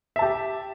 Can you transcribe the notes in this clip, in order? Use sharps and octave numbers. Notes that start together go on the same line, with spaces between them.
G4 E5 A5